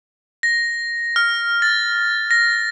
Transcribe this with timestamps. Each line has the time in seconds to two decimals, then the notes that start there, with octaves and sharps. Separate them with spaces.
0.43 A#6
1.16 F6
1.62 A6
2.31 A#6